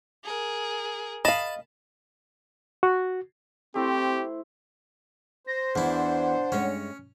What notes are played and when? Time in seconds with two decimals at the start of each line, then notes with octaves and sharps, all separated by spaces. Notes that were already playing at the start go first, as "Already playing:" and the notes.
0.24 G#4 A#4
1.25 D#5 F5 A5 B5
2.83 F#4
3.75 A3 C4 E4 G4 C5
5.47 C5 A#6
5.75 E2 D4 E4 F#5
6.52 G2 G#3 C#4 C#5